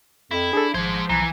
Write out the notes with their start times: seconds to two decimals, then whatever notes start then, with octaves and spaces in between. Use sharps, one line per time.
0.31 F2 E4
0.53 D4 G#4 A4
0.74 G#1 F3 G#3 C5 G#6
1.10 B1 E3 A#5